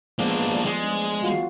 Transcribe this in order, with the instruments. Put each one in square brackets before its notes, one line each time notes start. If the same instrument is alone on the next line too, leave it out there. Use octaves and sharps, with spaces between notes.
[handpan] F3 G#3 B3 [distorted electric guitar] A#3 D4
[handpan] F3 G3 D5
[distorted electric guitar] G#3
[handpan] D4
F4 F#4 G#4